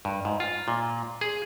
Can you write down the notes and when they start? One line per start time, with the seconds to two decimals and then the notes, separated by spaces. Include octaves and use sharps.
0.05 G2
0.25 G#2
0.40 F4
0.68 A#2
1.21 G#4